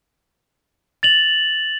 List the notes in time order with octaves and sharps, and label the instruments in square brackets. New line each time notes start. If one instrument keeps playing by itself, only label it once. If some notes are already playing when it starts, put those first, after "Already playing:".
[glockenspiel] A6 F7 F#7